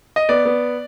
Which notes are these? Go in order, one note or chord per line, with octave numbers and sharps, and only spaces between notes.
D#5
B3 D5
B3